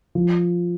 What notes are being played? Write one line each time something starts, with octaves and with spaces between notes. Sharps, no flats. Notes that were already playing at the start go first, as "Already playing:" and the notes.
F3